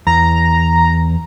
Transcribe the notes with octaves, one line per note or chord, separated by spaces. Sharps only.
E2 A#5